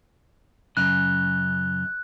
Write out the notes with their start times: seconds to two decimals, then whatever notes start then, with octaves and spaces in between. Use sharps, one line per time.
0.77 F#2 C#3 F#6